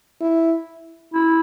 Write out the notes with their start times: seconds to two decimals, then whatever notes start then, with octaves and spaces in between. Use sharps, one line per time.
0.21 E4
1.14 E4